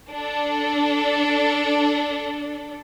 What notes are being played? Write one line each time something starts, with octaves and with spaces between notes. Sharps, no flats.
D4 A4